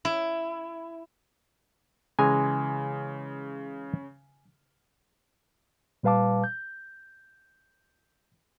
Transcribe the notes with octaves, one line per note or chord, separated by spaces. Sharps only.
E4
C#3 E3 G#3 G#5 A#5
A#2 G3 B4 F5 A5 D6
G6